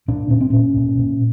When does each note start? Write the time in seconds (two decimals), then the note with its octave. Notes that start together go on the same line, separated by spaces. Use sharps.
0.08 A#2 D4
0.30 A#2 C#4
0.40 C4
0.50 A#2 C#4
0.77 A#2
0.98 A#2